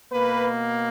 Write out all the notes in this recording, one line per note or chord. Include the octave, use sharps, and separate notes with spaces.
B2 A#3 B4